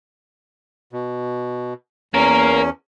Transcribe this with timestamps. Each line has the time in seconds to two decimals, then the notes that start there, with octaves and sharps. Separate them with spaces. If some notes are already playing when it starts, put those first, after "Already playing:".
0.92 B2
2.14 E2 A#3 C#4 A#4